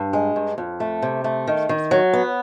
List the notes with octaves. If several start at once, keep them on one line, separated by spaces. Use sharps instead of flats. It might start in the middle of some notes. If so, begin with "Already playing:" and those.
Already playing: G2
G#3
G2
F2
A3
C3
A3
D#3
D#3
F#3
B3